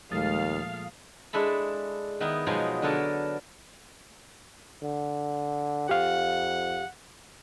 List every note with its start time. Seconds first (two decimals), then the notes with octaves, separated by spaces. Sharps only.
0.11 D#2 A#2 F3 G#3 A3 F5 D#6 A6
1.33 G#3 D4 E4 A4 B5
2.20 D#3 B3 D#4 E4
2.46 B2 F3 F#3 G#3 D#4 G#4
2.82 D3 B3 D4 A4 A#4 C#5
4.82 D3
5.89 F2 G4 F5 F#5